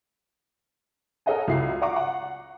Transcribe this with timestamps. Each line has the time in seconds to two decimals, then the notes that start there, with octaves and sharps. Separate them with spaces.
1.26 A4 A#4 C#5 D#5 F#5 G#5
1.48 C#2 E4 F#4 C7
1.81 D5 F5 F#5 A#5 C#6 D6
1.96 F#5